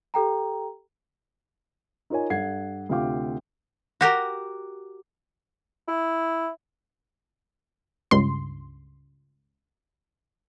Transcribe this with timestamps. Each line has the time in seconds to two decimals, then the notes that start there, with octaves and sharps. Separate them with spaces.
0.14 G4 A4 G5 A#5
2.10 D#4 F4 A#4 C#5 G#5
2.30 G2 A4 F#5 G#6 C7
2.89 D2 C3 F4 F5 G5 D6
4.01 F#4 G4 A#4
5.88 E4
8.11 C#2 G2 C6